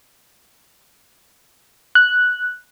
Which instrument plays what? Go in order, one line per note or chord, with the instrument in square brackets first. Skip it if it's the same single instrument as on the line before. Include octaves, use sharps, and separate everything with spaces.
[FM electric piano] F#6